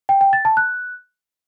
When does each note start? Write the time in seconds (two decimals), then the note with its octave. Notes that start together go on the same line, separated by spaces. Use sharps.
0.09 G5
0.21 G5
0.33 A6
0.45 A5
0.57 F#6